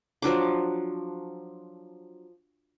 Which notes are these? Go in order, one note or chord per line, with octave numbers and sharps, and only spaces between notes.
F3 F#3 D4 D6